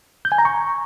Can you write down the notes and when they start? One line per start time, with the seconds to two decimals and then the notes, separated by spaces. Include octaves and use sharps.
0.25 G6
0.32 G#5
0.38 A#5
0.45 C#6